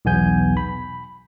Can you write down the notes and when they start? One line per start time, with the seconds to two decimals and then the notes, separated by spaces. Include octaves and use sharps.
0.05 B1 E2 B3 G#5 G6
0.57 B5